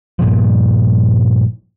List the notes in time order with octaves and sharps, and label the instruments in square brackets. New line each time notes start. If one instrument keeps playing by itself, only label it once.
[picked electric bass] G2 A#2 F3